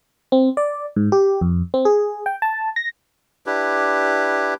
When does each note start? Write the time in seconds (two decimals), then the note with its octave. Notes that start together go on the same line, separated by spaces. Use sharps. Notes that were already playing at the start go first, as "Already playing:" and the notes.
0.32 C4
0.57 D5
0.96 G#2
1.12 G4
1.41 F2
1.74 C4
1.85 G#4
2.26 G5
2.42 A5
2.76 A#6
3.46 D4 E4 G4 B4